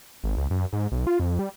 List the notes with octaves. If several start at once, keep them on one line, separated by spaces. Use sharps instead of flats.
G#1
C#2
F#2
G#2
B1
F4
F2
G3